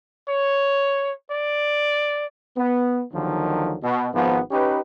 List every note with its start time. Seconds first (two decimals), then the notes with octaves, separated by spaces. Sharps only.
0.29 C#5
1.31 D5
2.57 B3
3.14 D#2 D3 D#3 F3 F#3
3.83 B2
4.14 G#1 G#2 F3 B3
4.51 C#4 D#4 G4 B4